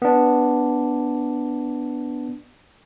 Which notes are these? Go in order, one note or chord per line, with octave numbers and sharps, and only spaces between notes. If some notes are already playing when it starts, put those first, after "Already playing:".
B3 D4